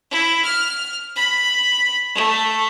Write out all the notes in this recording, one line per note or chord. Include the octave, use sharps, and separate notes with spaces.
E4
F6
B5
A3